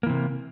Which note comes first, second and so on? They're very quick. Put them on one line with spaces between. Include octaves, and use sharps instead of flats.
A#3 E3 C3